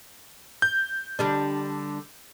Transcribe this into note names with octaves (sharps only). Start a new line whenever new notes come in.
G6
D3 G3 D4